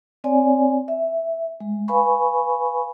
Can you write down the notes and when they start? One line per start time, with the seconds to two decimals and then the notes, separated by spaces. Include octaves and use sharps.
0.24 C4 C#5 D5 G#5
0.88 E5
1.60 G#3
1.88 B4 F5 G#5 B5 C#6